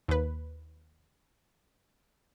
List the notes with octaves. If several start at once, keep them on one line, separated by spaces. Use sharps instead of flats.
D#2 B4